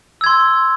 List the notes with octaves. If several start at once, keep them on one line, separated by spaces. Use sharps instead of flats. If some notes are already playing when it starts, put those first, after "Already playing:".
C6 E6 G#6